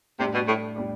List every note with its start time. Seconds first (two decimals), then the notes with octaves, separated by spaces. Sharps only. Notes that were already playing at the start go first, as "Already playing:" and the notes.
0.19 A2 C3 G3 D4 G4
0.34 B2
0.48 A2
0.76 A2 G3 D4 G4